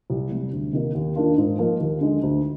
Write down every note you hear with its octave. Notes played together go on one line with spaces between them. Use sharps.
C2
C3 G3
D2
C3 D#3 A#3
D#2
D#3 A#3 D4 F4
G#2
F3 A#3 D#4
D#2
D3 G#3 D#4
D2